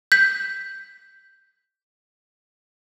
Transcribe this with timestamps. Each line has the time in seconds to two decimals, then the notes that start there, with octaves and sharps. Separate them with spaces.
0.12 G6 B6